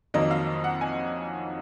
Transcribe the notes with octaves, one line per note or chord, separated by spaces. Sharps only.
F2 D#3 F#3 A#3 D#5
F5
F#5
G#5